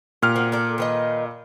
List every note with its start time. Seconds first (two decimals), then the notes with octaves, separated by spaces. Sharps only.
0.22 A#2 G4 F6
0.36 A#3 C4 F#4
0.52 A4 A#4 D5
0.78 D#3 B4 D#5